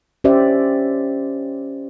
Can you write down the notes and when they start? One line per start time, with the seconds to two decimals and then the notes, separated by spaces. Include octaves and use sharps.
0.24 C#4 G4 C5 D5 E5